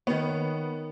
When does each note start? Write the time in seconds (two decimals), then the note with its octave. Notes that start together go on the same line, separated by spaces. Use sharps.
0.07 D#3 B3 C#5